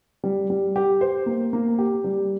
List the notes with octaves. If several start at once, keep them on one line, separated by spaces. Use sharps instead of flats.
G3
G3
G4
C5
A#3
A#3
G4
G3